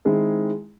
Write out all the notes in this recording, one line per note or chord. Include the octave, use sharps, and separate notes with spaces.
D#3 G#3 C4 E4 G#4